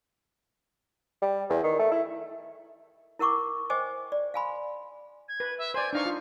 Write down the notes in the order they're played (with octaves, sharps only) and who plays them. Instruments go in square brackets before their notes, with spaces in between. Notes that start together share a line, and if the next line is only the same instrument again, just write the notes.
[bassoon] G3
E2
D#3
A3
E4
[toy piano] E4 A#4 F#5 C#6 D6
C5 D#5 G5 G#5 D6
D5
F5 G#5 B5 C6
[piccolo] G#6
[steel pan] B4
[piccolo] E5
[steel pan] C5 D5 [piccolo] G#5
[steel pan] D4 D#4 C#6 [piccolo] F5
[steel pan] F4